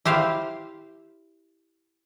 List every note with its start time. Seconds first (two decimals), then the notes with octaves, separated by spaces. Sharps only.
0.05 E4 G4 C5 F5